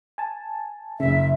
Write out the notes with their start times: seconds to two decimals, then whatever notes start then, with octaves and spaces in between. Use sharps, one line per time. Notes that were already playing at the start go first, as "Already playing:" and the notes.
0.18 G#5 A5
1.00 F#1 C#3 E5